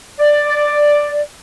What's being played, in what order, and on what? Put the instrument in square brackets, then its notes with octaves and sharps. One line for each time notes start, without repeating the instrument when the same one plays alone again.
[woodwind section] D5